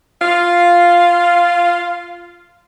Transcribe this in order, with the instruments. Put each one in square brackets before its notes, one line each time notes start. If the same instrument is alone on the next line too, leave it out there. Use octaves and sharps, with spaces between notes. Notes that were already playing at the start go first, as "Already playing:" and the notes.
[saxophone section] F4 F5